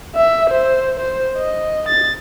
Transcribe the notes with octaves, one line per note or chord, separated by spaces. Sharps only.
E5
C5
C5
D#5
A6